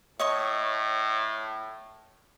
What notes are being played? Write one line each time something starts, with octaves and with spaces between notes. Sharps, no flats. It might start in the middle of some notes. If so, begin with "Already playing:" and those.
A2 C#5 D#5 C#6